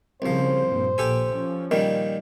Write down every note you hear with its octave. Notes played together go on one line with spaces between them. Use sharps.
C2 C#3 F3 C5
G2 A#2
A#1 A#2 G4 A4 G#5
F3 C#4
A#2 D#3 G3